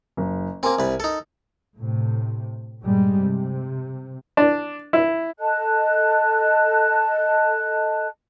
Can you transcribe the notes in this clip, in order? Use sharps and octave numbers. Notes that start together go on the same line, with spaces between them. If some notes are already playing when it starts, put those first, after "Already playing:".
F#1
A#3 C4 A#4 G#5
C2 B4
D#4 A4
A2 C3
G2 A#2 G3 G#3
C3
D4
E4
A4 D#5 A5 F#6